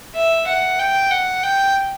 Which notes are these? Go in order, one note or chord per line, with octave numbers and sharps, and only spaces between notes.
E5
F#5
G5
F#5
G5